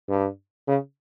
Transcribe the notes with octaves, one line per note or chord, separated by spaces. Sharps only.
G2
C#3